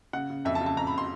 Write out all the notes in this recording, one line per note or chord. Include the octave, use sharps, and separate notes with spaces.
C#3 F#5
C#3
F2 E5
A5
C#3
A5
F2 A#5
B5
C6